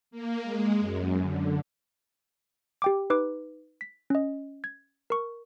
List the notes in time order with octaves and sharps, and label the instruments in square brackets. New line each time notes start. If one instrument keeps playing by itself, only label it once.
[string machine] A#3
G#3
F#2
D3
[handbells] G4 G5 D6
D#4 B4 D6
B6
C#4 D#5
G#6
A#4 C#6